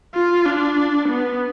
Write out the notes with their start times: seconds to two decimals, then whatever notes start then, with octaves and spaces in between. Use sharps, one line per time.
0.14 F4
0.46 D4
1.09 B3